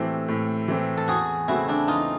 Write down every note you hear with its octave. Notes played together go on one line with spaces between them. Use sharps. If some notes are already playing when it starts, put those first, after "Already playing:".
Already playing: A2 E3 A3 C4 G4 A4
A2
E3 A3 C4
A4
E2 F#4 G#4
C#3 E3 A3 C4 E4 F#4
D4 E4
E2 D#4 F4